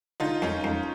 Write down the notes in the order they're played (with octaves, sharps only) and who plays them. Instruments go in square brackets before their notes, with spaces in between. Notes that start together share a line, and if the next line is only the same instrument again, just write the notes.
[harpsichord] D3 [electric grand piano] D#4 F4
[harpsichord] F2 [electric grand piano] C#4 D#4
[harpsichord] F2